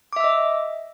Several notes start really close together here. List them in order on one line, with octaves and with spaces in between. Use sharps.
D6 E5 E6 D#5